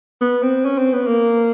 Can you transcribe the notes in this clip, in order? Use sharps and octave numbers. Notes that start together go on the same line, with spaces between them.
B3
C4
C#4
C4
B3
A#3